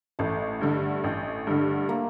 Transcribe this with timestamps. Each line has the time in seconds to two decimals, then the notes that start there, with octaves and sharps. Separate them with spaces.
0.19 A1 A3
0.61 G2 D3
1.04 A1
1.47 G2 D3
1.89 A#3